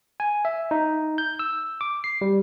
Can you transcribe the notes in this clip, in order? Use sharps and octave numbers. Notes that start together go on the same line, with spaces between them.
G#5
E5
D#4
G6
E6
D6
C7
G3